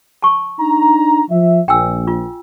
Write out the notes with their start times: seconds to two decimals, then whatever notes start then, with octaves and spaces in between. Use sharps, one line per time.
0.22 A5 C#6
0.59 D4 D#4 A#5
1.30 F3 E5
1.68 A#1 G5 G#5 E6
2.07 F4